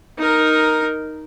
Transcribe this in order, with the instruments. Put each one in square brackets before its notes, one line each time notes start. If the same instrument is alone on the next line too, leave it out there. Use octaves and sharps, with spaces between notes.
[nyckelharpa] D#4 A#4